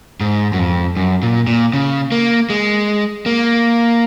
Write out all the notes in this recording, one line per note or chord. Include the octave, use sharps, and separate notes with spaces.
G#2
F#2
F2
F#2
A#2
A#2
C#3
A#3
G#3
A#3